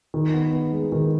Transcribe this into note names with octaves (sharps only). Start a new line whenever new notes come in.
D#3
B3
B3
G#3
D#3